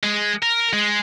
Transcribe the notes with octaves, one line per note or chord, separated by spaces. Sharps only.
G#3
A#4
G#3